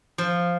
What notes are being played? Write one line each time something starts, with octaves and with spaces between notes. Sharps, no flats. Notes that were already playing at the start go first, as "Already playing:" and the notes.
F3